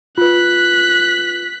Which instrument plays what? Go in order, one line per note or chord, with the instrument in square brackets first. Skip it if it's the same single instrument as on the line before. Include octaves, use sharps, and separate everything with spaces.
[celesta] F4 B4 [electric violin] F#6 B6